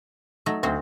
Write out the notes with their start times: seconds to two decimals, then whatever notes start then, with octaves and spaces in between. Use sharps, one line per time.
0.46 F#3 A3 D#4
0.63 D2 C4 F#4 C5